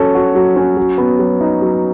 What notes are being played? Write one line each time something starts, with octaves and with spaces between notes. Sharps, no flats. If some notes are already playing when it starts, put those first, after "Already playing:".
Already playing: F#3 C#4 A4
F#4
F#3
C#4
F#3
B3
F#3
D#4
F#3